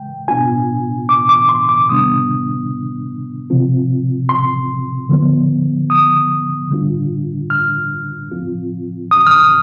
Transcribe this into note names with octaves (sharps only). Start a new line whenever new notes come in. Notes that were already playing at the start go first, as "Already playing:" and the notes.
Already playing: G#3 G5
B2 B3 D4 F4 G#5
D6
D6
C6
D6
C3 D#3 G3 B3 D4 D#6
C3 F3 C4 F4
C6
D3 F3 B3
D#6
D3 G3 D4 F4
F6
F3 C4 F4
D#6
F6
D#6